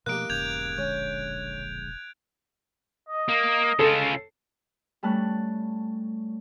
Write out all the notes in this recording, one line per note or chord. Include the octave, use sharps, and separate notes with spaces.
B2 F3 A3 A#3 D#4 G4 F#6 D7
E1 E2 G#2 C#3 G6 G#6 F7
A#1 D3 G#3 C#4
D#5
A#3
C#3 F4 A4
G3 A3 C#4 A5 F#6